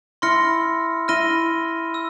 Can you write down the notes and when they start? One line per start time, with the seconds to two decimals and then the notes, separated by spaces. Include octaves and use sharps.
0.22 E4 C6 F6 A#6 C#7
1.08 E4 F6 A#6 D#7 G7
1.94 E6